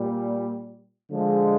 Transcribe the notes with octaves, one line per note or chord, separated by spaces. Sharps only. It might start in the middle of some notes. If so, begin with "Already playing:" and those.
Already playing: A#2 G3
D3 F3 G#3